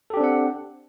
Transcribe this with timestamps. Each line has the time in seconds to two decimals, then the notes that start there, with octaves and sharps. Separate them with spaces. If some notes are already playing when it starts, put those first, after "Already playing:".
0.10 A4
0.14 G4
0.17 D4
0.20 C4
0.24 F#5